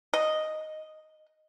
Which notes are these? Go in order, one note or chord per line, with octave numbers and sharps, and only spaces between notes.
D#5